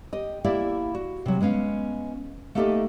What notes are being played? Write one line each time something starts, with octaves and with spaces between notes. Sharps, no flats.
G4 D#5
A#3 E4 G4 D5 E5
F#4
C3 F#3
G#3 B3 C#4 F5
A3 A#3 D#4 G4 A4 D#5